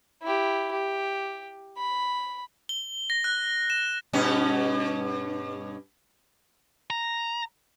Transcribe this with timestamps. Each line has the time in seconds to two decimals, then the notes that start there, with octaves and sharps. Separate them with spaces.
0.22 E4 G4
0.71 G4
1.77 B5
2.69 G7
3.10 A#6
3.24 F#6
3.70 E7
4.13 G2 B2 C#4
6.90 A#5